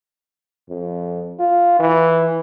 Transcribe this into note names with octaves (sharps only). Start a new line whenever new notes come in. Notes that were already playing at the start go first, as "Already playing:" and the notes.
F2
F4
E3